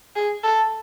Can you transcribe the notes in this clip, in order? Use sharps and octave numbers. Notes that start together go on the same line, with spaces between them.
G#4
A4